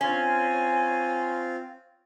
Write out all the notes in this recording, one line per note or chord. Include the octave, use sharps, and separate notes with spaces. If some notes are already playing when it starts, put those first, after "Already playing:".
C4 C#4 F4 G#5